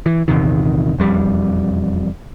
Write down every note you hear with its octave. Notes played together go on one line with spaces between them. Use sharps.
E3
A#1 E2 C3 D#3
E1 F2 G3